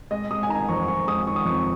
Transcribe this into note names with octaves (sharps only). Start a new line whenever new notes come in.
G#3 D#5
G#3 D#6
G#5
D#3 A#5
F2 C#6
F2 C#6
G#3 D#6
D#3 C#6
D#6
F2 C#6